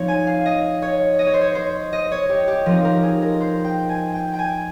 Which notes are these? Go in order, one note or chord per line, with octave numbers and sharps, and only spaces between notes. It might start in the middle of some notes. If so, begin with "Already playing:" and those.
Already playing: F3 C4 D#4 C#5
G#5
F5
D#5
C#5
D#5
C#5
C5
C#5
C5
D#5
C#5
G4
G4
F3 C4 D#4 A#4
A#4
G#4
A#4
C5
G5
G#5
G5
G5
G#5